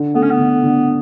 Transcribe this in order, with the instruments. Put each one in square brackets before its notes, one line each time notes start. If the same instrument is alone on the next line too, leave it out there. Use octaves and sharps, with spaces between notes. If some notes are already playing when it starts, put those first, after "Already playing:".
Already playing: [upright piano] D3
[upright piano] A3 [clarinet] B3
[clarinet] C#4
B3
[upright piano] D3
D3